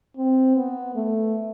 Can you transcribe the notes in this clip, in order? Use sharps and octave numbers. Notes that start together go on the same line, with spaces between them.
C4
B3
A3